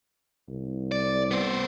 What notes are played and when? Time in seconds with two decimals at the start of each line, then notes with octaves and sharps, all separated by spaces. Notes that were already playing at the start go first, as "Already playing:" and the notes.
0.49 C2
0.92 D5
1.31 B3 C5